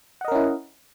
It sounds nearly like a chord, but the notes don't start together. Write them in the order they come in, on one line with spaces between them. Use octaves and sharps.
F#5 D#5 A#4 C#4 E4